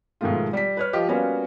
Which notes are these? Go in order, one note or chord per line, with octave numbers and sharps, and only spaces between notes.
G#2 B2 D#3 F3 A3 F4
G3 B6
B4 C#5 F6
F3 F4 G4 D#5
G3 A#3 B3 C#4 F4 F#4